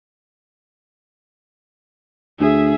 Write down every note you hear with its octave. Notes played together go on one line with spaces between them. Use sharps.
D2 G#4 E5